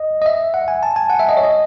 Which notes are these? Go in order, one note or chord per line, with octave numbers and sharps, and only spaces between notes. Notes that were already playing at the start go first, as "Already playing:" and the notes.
Already playing: D#5
D#5
E5
F#5
G#5
A5
G#5
F#5
E5
D#5
C#5
D#5